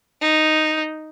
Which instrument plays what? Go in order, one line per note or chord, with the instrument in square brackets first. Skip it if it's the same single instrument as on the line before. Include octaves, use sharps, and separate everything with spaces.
[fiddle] D#4